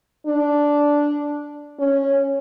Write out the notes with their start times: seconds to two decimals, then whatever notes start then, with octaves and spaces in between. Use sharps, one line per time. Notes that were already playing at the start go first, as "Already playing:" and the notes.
0.26 D4
1.79 C#4